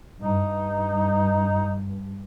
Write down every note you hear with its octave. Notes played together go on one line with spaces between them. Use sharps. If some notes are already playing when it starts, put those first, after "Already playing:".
G2 D#4